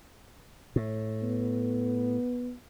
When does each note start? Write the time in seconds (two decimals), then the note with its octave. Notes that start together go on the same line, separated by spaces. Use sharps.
0.76 A2
1.23 B3